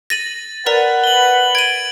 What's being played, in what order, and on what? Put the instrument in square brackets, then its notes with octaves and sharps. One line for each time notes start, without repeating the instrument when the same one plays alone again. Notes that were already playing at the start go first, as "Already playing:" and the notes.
[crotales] A6 [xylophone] A#6 D#7 F#7
[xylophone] A#4 D5 A#5 [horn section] B4 F#5
[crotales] F#7 G7
[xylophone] G#6 D#7 [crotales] D7